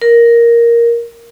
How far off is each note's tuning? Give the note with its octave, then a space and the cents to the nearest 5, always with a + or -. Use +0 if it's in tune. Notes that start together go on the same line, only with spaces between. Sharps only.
A#4 +5